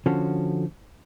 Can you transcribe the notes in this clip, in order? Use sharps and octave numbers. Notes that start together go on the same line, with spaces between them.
D3 F3 C#4 F#4 A4